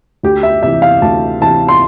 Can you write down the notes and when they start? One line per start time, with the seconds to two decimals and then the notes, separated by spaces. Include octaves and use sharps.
0.23 D2 G4
0.43 E5
0.63 C3 E3 E5
0.82 F5
1.02 D2 A5
1.41 C3 E3 A5
1.68 C6